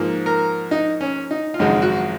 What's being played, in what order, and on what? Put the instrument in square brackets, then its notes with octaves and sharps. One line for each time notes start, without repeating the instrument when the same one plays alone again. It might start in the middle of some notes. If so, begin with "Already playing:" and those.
Already playing: [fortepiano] G#2 F3 A#3
A#4
D#4
C#4
D#4
F4
G#1 F#2 C#3 F3 G#3 D#4
F#4